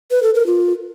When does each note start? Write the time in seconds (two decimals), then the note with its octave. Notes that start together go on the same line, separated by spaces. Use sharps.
0.11 B4
0.23 A4
0.35 A#4
0.46 F4